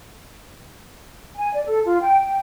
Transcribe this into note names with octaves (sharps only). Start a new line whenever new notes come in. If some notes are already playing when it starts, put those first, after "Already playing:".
G#5
D5
A4
F4
G5
G5